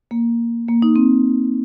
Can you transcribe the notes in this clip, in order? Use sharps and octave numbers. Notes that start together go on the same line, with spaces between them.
A#3
A#3
D#4
C4